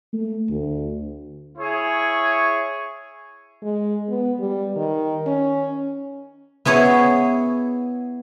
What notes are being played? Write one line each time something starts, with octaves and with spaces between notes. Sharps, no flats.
A3
D2
E4 G#4 C#5
G#3
B3
G3
D#3
C#4
B3 E4 G#4 C#5 F#5